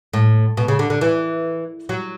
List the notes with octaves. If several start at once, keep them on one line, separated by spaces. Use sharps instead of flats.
A2
B2
C#3
D3
D3
E3
F#3